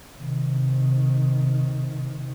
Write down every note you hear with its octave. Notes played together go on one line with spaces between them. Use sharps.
C3 D#3